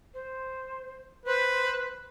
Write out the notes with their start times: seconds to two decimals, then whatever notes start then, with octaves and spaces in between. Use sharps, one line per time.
0.14 C5
1.26 B4 C5